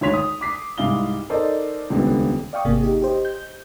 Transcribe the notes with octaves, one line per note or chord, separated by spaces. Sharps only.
G#1 D2 C#5 C6 B6 F7
D#6
D6 B6 C7
C2 G#2 E4 F5 G7
D#4 A4 A#4 C5 D5 D#5
D#1 C#2 D3 B3
D5 F5 G5 C#6 D#6
G#1 C3 A#3 G#4
D#4 G4
G4 C5 D#5
G6